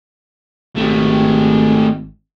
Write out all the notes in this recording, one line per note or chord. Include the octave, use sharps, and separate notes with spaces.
G#1 A3 G4